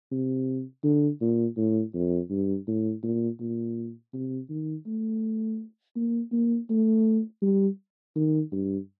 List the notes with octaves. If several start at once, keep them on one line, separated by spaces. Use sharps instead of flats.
C3
D3
A#2
A2
F2
G2
A2
A#2
A#2
C3
D#3
A3
A#3
A#3
A3
G3
D#3
G2